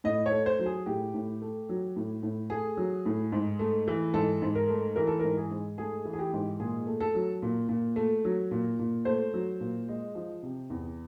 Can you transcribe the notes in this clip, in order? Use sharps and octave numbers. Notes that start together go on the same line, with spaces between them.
A2 D#5
C#5
A3
C5
F#3
G#4
A2 G4
A2
A3
F#3
A2
A2
A3 G#4
F#3
A2
G#2
A3
E3
G#2 A4
G#2
A#4
A3
E3 A#4
A4
G#2 A#4
G#4
G#2
A3 G#4
E3
G#4
G4
G#2
A#2 G#4
A3
A4
F#3
A#2
A#2
A3
F#3
A#2
A#2
A3 C5
F#3
A#2
G#3
F3
C3
E2